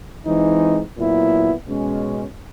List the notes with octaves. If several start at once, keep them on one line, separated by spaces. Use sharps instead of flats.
E3 G#3 C4 D#4
A#2 F#3 B3 E4
B2 G#3 C#4